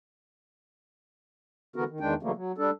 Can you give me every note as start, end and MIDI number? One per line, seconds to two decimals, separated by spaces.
1.76 1.84 50
1.76 1.84 52
1.76 1.84 59
1.76 1.84 66
1.76 1.84 70
1.89 1.99 51
2.00 2.14 40
2.00 2.14 51
2.00 2.14 56
2.00 2.14 62
2.00 2.14 79
2.23 2.31 49
2.23 2.31 52
2.23 2.31 54
2.23 2.31 55
2.23 2.31 57
2.23 2.31 58
2.36 2.52 54
2.58 2.70 55
2.58 2.70 62
2.58 2.70 69